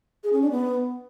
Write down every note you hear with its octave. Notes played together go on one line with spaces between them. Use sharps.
G#4
C#4
D4
B3